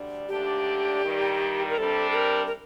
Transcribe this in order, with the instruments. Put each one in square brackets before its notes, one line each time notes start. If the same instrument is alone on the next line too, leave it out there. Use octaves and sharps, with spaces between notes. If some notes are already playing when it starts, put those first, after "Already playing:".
Already playing: [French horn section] D2 D3 G3 D4
[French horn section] D#2 D3 A3 D4 [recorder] G4
[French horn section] G2 D#3 G3
[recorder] A#4
[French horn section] C3 G3 D4 [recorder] A4
[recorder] A4
A#4
A#4